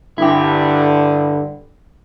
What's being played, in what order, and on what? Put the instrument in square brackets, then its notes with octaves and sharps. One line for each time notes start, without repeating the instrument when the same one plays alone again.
[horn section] G2 D3 [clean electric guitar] E4 G4